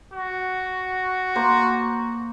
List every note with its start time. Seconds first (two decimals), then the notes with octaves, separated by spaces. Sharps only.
0.14 F#4
1.36 A#3 C5